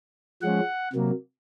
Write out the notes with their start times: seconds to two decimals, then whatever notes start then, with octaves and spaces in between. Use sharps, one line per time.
0.42 F3 G#3 C#4 F#5
0.93 C3 F#3 A#3